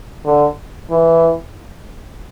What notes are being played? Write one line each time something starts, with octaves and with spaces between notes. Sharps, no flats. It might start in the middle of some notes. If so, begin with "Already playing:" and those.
D3
E3